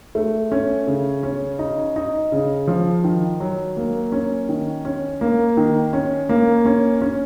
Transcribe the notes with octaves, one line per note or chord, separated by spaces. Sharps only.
A3
C#4
C#3
C#4
D#4
D#4
C#3
F3
D#3
F#3
A#3
C#4
D#3
C#4
A#3
D#3
C#4
A#3
C#4
C#4